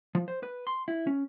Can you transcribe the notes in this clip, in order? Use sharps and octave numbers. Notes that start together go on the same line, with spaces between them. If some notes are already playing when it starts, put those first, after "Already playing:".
F3
C5
B4
C6
E4
C#4